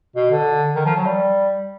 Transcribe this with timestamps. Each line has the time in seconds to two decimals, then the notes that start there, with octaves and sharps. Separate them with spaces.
0.16 B2
0.31 D3
0.76 D#3
0.86 F3
0.96 F#3
1.06 G3